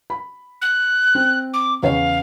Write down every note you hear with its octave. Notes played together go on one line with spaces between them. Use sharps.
B5
F#6
C4
D6
E2 C#3 C#5 F5